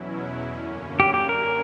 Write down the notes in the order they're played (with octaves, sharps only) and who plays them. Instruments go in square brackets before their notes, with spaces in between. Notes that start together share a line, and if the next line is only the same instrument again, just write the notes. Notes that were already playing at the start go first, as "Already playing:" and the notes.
Already playing: [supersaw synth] E2 B2 F#3 C#4 E4
F#2 D3 A#3 C#4
[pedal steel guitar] G4
G4
A#4